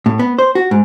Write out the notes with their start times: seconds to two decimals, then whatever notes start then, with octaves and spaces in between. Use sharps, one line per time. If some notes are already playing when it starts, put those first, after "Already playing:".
0.06 A2
0.19 B3
0.39 C5
0.55 F#4
0.71 G#2